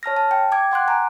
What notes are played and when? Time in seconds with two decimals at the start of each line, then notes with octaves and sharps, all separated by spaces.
0.03 C#5 A5 F6 A#6
0.16 A5
0.31 G5
0.52 G5 D6 G#6
0.72 F#5 C6 D6 F#6
0.88 G#5 A#5